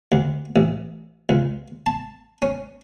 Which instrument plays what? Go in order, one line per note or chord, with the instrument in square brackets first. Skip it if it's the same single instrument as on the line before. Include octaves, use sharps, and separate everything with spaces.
[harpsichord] D2
A1
C#2
A5
C#4